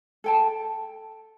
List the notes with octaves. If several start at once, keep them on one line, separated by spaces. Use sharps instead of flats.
A4 G5 A5